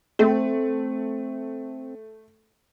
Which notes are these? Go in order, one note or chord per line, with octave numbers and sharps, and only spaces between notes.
A3 C4